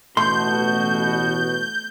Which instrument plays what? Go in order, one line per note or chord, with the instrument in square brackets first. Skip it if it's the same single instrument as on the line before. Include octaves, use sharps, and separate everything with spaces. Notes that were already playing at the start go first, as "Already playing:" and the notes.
[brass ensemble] A1 B2 F#4 [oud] A3 [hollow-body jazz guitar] C6 [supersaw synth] G6